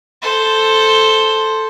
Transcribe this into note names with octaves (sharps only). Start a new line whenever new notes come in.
A4 C5